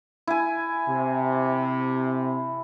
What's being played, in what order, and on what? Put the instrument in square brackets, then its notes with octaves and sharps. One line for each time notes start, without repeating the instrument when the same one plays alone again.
[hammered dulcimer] E4 G#5
[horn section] C3